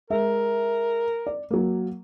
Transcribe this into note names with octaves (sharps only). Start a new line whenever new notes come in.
G#3 A#4 E5
D5
F#3 A#3